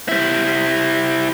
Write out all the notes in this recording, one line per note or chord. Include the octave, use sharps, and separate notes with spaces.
G3 E4